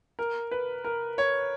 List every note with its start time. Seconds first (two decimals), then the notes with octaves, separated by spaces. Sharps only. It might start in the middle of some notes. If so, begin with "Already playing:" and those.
0.19 A#4
0.51 B4
0.85 A#4
1.18 C#5